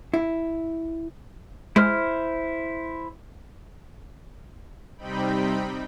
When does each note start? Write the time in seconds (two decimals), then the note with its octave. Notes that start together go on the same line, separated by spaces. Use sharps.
0.14 E4
1.76 G#3 E4 C5 F6
4.97 C3 G3 C4 D#4 G5 B5